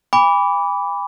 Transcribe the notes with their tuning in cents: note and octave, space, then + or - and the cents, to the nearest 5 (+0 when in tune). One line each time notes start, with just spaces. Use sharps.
G#5 -45 B5 +0 D6 -20